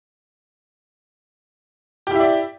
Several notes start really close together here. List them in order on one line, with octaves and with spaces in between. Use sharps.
G4 E4 E5 D5